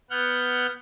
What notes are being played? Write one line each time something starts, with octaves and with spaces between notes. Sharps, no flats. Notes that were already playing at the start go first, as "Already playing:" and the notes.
B3 F#5 F6 G6